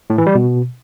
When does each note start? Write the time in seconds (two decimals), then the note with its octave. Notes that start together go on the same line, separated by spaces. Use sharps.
0.10 A2
0.18 E3
0.26 G3
0.35 B2